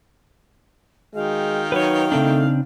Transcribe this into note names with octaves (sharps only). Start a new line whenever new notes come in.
D#3 G#3 F#4 F5 G5
F#3 D#4 B4 C#5
C#3 A3 C4 D4